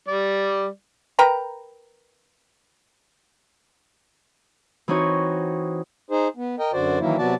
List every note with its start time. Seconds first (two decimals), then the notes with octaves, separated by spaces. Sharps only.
0.08 G3 D5
1.19 A#4 B4 G5 A#5
4.88 E3 C4 D#4 F#4 C#5
6.11 D#4 G#4 C5
6.36 B3
6.59 A#4 D#5 G5
6.73 F#2 D3 F#4 C5 D5
6.99 D#3 E3 F#3 A#3 E4
7.18 C3 F#3 B3 F#4 D5 A5